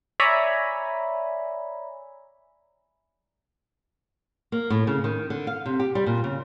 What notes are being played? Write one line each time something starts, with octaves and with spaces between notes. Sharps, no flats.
C#5 D5 E5 G#5 A#5 B5
A#3
A2
C#3
D#3
D3
F5
C3
G4
G3
A#2
C#3